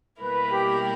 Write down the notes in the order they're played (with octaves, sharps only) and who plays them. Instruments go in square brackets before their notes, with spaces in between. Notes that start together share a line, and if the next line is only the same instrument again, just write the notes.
[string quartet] B2 G3 A#3 E4 A#4 [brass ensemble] B4
[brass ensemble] G4